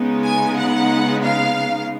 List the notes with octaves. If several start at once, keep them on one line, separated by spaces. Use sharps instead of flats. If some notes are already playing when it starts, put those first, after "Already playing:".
Already playing: C#3 G#3 B3 D#4
G#5
F#5
F5